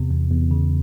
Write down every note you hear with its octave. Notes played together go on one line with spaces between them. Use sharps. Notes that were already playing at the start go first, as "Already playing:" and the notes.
Already playing: E2 C3 B3
E2
E2
C#3